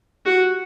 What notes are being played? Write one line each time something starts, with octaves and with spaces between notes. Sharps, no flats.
F#4